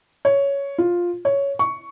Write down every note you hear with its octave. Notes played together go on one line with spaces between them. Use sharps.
C#5
F4
C#5
C#6